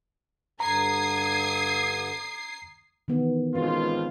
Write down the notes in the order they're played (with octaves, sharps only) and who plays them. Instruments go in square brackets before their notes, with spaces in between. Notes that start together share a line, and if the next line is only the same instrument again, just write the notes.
[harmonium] G2 D3 [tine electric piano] A#5 [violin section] D#6 G#6 [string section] C7
[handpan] D#3 E3 B3
[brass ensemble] G#1 F4 [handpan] B3 C#4 B4